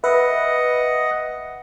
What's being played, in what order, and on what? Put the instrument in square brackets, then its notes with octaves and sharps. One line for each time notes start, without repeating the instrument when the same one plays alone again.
[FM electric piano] B4 E5 [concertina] D#5 F#5